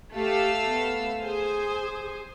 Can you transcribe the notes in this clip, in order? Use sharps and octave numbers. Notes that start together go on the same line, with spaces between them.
A3 G4 F5 E6
B3
G#4 C5 G#5